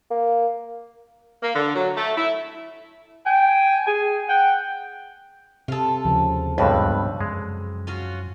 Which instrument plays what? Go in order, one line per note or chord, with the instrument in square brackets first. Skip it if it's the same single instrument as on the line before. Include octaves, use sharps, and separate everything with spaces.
[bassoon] A#3
[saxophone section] A#3
D3
F#3
A3
E4
[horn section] G5 G#5
G#4 G#5
F#5 G5
[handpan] C3 [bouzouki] F4 A4
[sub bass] D#2 [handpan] C#3 F3
[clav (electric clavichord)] C#2 G2 B2 [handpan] A4 C5 [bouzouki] B4
[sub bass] F#2 [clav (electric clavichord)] G#3
[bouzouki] C#4 F4 F#4